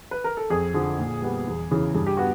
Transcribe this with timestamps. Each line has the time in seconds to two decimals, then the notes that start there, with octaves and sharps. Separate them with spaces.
0.11 B4
0.24 A#4
0.37 A4
0.50 F2 G#4
0.74 D3 F3 G#4
0.99 A#2
1.22 G3 B3
1.47 E2
1.71 C#3 E3
1.95 G2 G#4
2.07 G4
2.17 B3 F#4